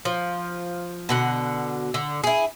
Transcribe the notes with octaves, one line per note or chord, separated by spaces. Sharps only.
F3
B2 D3 F#5
D3
E4 G#4